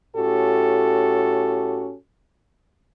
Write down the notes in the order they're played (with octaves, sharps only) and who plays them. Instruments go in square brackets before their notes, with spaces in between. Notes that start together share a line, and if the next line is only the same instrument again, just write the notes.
[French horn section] A2 C#4 F#4 G4 A4